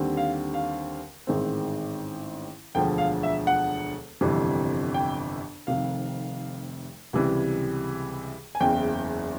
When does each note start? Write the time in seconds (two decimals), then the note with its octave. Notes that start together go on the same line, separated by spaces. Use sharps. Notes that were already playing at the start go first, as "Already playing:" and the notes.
Already playing: D#2 D3 G3 C4
0.17 F5
0.54 F5
1.27 A1 G#2 D#3 G#3 C4
2.75 E1 D2 D3 F3 G5
2.98 F5
3.23 E5
3.47 F#5
4.21 G1 F2 C3 E3 G3
4.94 G5
5.67 F1 F2 C3 D#3 F5
7.13 C#2 C3 E3 G3
8.55 G#5
8.60 F#1 E2 C#3 G5